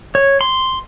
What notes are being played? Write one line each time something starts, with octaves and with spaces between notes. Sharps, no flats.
C#5
C6